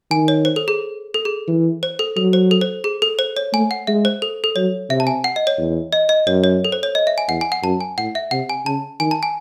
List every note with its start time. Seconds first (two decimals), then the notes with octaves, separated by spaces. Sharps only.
0.11 D#3 G#5
0.28 C#5
0.45 C5
0.56 A4
0.68 G#4
1.14 A4
1.25 G#4
1.48 E3
1.83 C5
1.99 A4
2.16 F#3 A4
2.33 C5
2.51 A4
2.61 C5
2.84 G#4
3.02 A4
3.19 C5
3.37 C#5
3.53 A3 G#5
3.71 F#5
3.87 G#3 E5
4.05 C5
4.22 A4
4.44 A4
4.56 F#3 C#5
4.90 C3 E5
5.00 A5
5.07 G#5
5.24 F#5
5.36 D#5
5.47 C#5
5.58 E2
5.93 D#5
6.09 D#5
6.27 F#2 C#5
6.44 C#5
6.64 A4
6.72 C5
6.83 C#5
6.95 D#5
7.07 E5
7.18 G#5
7.29 E2 F#5
7.41 G#5
7.52 F#5
7.63 F#2 A5
7.81 G#5
7.98 A2 F#5
8.15 E5
8.31 C3 F#5
8.49 G#5
8.65 C#3 A5
9.00 D#3 G#5
9.11 A5
9.23 G#5